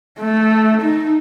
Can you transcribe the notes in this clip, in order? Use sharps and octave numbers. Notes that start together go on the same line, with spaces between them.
A3
D#4